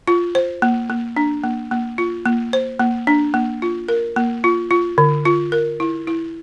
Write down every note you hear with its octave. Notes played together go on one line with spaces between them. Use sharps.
F4
C5
A#3
A#3
D4
A#3
A#3
F4
A#3
C5
A#3
D4
A#3
F4
A#4
A#3
F4
F4
D3
F4
A#4
E4
E4